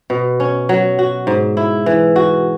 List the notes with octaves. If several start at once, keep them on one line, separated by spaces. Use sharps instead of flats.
B2
C#4
F#3
F#4
G#2
E4
E3
F#4